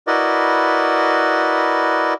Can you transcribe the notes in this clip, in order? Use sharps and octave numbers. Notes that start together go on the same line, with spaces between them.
E4 F#4 A#4 B4 D5 D#5